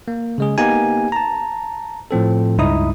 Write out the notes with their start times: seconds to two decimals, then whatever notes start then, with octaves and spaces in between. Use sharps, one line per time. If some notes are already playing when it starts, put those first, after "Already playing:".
0.08 A#3
0.38 C#3 G#3 G#4
0.58 A#3 B3 D#4 G4 G#5
1.12 A5 A#5
2.11 A2 F3 C4 A4
2.58 C#2 G2 D#4 E4 D#6